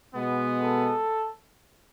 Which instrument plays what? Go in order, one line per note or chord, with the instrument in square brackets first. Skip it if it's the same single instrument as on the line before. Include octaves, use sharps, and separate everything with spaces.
[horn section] B2 G#3 B3
[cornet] A4